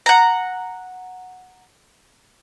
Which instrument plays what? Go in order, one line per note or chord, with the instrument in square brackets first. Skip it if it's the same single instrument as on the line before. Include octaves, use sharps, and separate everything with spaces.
[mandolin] F#5 A#5